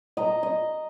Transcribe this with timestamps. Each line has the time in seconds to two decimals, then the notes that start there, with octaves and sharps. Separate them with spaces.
0.17 D#5 A#5
0.43 D#5